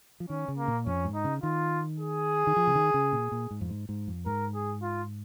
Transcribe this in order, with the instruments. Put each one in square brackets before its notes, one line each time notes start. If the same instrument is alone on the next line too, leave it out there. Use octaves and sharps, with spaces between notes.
[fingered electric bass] F3
[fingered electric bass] D#3 [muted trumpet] C#4
[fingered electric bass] C#3
[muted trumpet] A#3
[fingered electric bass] A#2
[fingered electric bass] F2 [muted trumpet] C#4
[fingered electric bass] G#2
[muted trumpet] D#4
[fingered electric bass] C#3
[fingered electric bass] D#3 [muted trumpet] F4
[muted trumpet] G#4
[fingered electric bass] D#3
F3
C#3
D#3
C#3
A#2
A#2
G#2
F2
G#2
G#2
F2
[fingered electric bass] G#2 [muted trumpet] A#4
[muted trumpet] G#4
F4